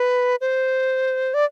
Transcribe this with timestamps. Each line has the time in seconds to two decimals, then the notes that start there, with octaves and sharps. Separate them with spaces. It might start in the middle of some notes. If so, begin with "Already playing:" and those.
Already playing: B4
0.41 C5
1.34 D5